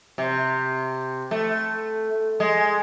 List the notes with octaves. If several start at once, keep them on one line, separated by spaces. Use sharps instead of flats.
C3
A3
G#3